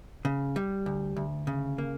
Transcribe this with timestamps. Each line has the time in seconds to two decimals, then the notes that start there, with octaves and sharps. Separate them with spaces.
0.25 C#3
0.56 G3
0.86 D2
1.16 D2
1.47 C#3
1.78 A#3